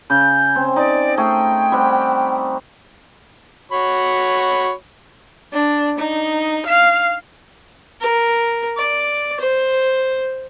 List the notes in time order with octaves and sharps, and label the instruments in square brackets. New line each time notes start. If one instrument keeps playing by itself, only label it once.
[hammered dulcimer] C#3 [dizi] G6
[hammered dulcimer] C4
[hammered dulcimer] D#4 [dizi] D5
[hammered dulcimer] A3 G#4 [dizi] G5
[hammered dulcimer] G3 C4 F#5
[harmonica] F#4 C#5 B5
[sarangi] D4
D#4
F5
[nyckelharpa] A#4
D5
C5